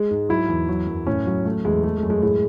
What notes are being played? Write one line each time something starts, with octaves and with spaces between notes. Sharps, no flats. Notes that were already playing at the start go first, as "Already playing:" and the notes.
Already playing: G#3
G#2
F#3 E4
E2
F#3
F#2
A2 C#4
F#3
F#3 A3
E2 G#3
G#3 A3
A3
F#2
G#3
A2 G#3